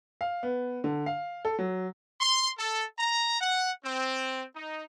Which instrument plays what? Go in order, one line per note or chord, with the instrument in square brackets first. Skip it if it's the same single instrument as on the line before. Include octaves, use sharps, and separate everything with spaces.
[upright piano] F5
B3
D3
F5
A4
F#3
[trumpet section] C6
A4
A#5
F#5
C4
D#4